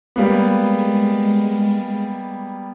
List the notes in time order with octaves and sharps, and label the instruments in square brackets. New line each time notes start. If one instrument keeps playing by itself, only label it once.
[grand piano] G3 A#3 B3 [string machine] G#3